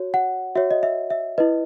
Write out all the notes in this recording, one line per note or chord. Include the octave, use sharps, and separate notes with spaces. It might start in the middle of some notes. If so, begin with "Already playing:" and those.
Already playing: F#4 C#5
F#5
F#4 C#5 E5
D#5
E5
E5
E4 B4 D#5